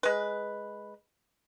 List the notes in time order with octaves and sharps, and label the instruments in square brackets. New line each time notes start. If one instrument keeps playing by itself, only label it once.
[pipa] G#3 B4